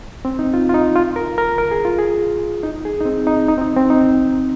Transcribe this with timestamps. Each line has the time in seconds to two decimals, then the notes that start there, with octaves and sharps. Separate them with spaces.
0.25 C4
0.39 D#4
0.54 F4
0.69 F4
0.74 D#4
0.96 F4
1.16 A#4
1.38 A#4
1.58 A#4
1.71 G#4
1.85 F4
1.99 G#4
2.63 D#4
2.85 G#4
3.00 D#4
3.05 C4
3.27 D#4
3.48 D#4
3.58 C4
3.61 D#4
3.76 C4
3.90 D#4